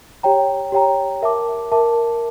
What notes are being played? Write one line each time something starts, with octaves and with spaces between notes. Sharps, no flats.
G4 C#5 G5 A#5
G4 C#5 G5 A#5
A#4 E5 A5 D6
A#4 E5 A5 D6